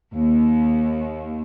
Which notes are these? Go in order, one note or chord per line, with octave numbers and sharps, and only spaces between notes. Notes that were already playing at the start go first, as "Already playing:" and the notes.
D#2